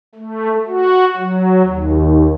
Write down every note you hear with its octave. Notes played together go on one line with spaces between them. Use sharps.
A3
F#4
F#3
D#2